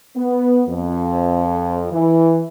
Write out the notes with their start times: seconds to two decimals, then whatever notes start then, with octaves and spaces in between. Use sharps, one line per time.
0.16 B3
0.68 F2
1.91 E3